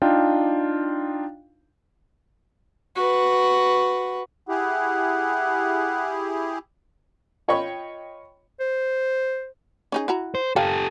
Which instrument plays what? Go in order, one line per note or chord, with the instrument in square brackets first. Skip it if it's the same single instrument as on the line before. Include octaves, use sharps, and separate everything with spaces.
[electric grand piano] D4 D#4 F4 F5 G5
[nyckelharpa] F#4 B4
[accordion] E4 G4 G#4 [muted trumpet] F#5
[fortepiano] F4 C#5 D#5 G5 B5 C#6
[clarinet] C5
[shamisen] C#4 D#4 G#4
E4 F#4 A#5
[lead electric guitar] C5
[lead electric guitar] G4 A4 [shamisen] A#4 F5 G5